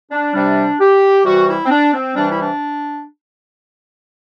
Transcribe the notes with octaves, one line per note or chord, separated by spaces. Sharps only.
D4
C3 G3 D4
G4
C3 E3 G3 F#4
E4
C4
D4
C4
C3 E3 G3 D4
E4
D4